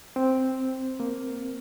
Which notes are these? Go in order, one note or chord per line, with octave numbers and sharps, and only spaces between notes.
C4
A#3